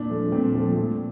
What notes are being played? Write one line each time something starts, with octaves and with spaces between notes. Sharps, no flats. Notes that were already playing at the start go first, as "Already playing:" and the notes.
Already playing: A#2 D4
F3 A3
A#2 C4
F3 A3
A#2